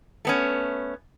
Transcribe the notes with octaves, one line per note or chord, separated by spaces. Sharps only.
A3 B3 C#4